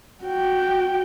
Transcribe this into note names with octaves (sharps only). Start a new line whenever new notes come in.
F#4 G5